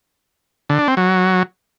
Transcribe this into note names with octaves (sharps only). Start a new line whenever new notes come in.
D3
D4
C4
F#3